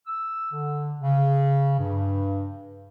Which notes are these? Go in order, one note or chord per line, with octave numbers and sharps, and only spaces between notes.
E6
D3
C#3
G2